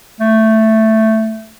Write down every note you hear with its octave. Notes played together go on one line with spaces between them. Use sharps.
A3